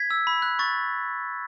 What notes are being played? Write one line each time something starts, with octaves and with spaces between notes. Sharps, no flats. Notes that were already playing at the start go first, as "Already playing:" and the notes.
Already playing: G#6 B6
E6
B5
F#6
C#6 A6